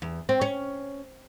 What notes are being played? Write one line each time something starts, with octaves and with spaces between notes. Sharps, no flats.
E2
C4
C#4